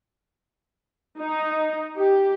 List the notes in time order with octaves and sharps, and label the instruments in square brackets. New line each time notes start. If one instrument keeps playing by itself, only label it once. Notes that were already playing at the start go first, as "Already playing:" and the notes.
[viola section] D#4
G4